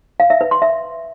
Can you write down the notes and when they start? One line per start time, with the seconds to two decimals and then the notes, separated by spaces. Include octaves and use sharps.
0.20 F5
0.30 E5
0.41 B4
0.51 C6
0.62 E5